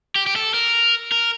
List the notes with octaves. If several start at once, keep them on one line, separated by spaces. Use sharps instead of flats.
G4
G4
A4
A#4
A#4